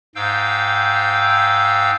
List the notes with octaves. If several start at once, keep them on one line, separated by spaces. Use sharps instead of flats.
G#2 F5 G5 E6 G6